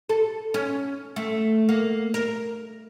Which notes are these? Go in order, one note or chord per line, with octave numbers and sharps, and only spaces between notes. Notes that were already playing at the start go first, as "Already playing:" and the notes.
A4
C#4
A3
A#3
A#4